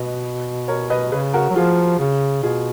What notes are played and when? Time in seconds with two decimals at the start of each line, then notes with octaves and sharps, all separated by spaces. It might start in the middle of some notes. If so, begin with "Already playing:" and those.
Already playing: B2 B4 D#5
0.68 A#4 C#5
0.90 B4 D#5
1.12 C#3 G#4 B4
1.33 F#4 A#4
1.50 F#3
1.56 F3 F4 G#4
1.99 C#3
2.43 B2 F4 G#4